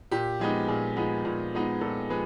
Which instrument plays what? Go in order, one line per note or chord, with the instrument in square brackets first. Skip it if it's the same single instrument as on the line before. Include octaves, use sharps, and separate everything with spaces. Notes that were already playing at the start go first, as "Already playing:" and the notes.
[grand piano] A#2 G4
F3 G#3 B3 D#4
A#2 G#4
F3 G#3 B3 D#4
A#2
F3 G#3 B3 D#4
A#2 A4
F3 G#3 B4